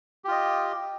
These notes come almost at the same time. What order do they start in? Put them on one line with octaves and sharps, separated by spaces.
G4 F4 D#5